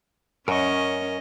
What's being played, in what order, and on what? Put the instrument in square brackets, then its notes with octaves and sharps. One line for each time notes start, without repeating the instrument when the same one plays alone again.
[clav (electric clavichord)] F#2 [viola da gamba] C#4 D#5 [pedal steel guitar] A#4 C#6